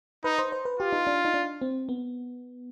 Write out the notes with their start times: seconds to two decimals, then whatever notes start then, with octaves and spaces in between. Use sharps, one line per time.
0.24 D#4 B4
0.39 C5
0.52 C5
0.65 B4
0.80 F4 G4
0.93 D#4
1.07 D4
1.25 D#4
1.34 D4
1.62 C4
1.89 B3